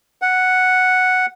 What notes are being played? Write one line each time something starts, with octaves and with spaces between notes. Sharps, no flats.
F#5